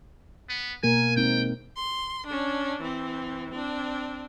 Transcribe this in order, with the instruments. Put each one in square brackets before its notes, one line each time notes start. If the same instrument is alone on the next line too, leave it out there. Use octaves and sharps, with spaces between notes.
[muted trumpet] B3
[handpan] B2 A#3 A#4 [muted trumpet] G#5
[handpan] G#3 C4 D#4 [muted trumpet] G5
[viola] C6
C#4 D4
E3 C4
C4 D4